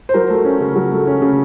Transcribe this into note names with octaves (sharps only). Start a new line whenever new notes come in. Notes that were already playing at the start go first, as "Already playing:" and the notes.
C5
F#3 A#4
A3
C#4
C#3
F#3
A3
C#4
C#3